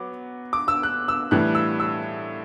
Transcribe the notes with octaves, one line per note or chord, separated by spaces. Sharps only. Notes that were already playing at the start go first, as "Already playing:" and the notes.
Already playing: F#3 B3 D6
D6
E6
F#6
E6
A2 E3 G3 F#6
E6
E6